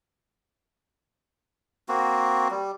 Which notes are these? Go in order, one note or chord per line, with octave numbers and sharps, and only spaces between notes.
A#3 C4 F#4
G3